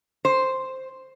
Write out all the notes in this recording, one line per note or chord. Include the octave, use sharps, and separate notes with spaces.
C5